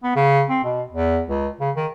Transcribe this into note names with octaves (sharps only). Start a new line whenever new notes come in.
B3
C#3
C4
B2
E2
C#2
C#3
D#3